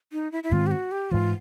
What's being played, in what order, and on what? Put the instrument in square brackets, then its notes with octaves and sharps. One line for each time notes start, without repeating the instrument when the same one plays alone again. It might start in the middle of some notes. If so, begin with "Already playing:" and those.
[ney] D#4
E4
E4
[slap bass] G#2 D#3 G#3 C4 [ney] F4
[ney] G4
F#4
G4
[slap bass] G#2 E3 [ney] F4